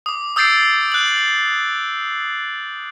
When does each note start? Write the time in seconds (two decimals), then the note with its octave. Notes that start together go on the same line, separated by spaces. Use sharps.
0.06 D6 D#6
0.36 D#6 E6 G6 A6 C7 D7
0.92 F#6 F#7